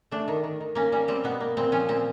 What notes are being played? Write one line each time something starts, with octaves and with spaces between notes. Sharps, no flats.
A3 D4
D#3
D#3
D#3
A#3 C#4
G3 C#4
G3 C4
B2 B3
A#3
A#2 C4
F3 C#4
A#2 C4